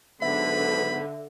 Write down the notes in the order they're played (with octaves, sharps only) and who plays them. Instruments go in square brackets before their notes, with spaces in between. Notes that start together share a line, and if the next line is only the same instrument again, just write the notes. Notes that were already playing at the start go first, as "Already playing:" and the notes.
[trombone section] G#2 F#3 B3 [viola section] D3 [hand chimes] E5 [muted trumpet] B5